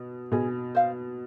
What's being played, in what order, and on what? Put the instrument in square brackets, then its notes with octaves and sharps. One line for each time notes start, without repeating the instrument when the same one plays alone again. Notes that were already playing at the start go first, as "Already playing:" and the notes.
Already playing: [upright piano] B2
[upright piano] B2 [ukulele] G#4
[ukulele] C5 F5